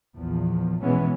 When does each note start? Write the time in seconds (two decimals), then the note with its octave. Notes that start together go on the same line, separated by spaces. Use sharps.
0.15 A#1 E2 F3
0.82 B2 E3 G#3 B3 C#4